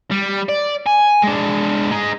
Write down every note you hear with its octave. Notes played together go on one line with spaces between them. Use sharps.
G3
D5
G#5
G#3 D4
D#4 G#4